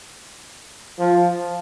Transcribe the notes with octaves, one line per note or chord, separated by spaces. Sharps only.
F3